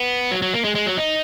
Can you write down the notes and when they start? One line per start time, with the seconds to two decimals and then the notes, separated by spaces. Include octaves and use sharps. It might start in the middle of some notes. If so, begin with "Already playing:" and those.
Already playing: B3
0.31 F#3
0.42 F#3
0.54 A#3
0.64 G#3
0.75 G#3
0.86 F#3
0.97 D#4